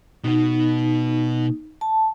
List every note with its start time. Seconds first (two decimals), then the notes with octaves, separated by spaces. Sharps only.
0.24 B2 B3 D#4
1.81 A5